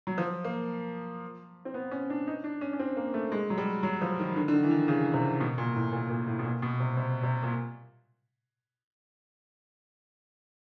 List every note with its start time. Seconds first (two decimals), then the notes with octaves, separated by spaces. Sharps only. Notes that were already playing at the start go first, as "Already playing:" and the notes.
0.07 F#3
0.18 F3
0.44 A#3
1.65 C4
1.74 B3
1.91 C#4
2.10 D4
2.27 D#4
2.44 D4
2.61 C#4
2.73 C#4
2.79 C4
2.97 A#3
3.14 A3
3.32 G#3
3.50 F#3
3.58 G3
3.83 F#3
4.02 F3
4.19 D#3
4.36 D3
4.48 D3
4.53 D#3
4.63 E3
4.70 D#3
4.88 C#3
5.14 C3
5.41 B2
5.58 A#2
5.75 A2
5.93 A#2
6.10 A#2
6.27 A2
6.39 B2
6.44 A#2
6.62 B2
6.80 C3
6.97 C3
7.23 C3
7.43 A#2